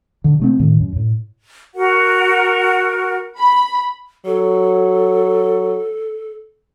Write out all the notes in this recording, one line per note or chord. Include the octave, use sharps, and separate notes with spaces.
D3
C3 A3 C4
A2 D#3
F#2
A2
F#4 A#4 F#5
B5
F#3 A4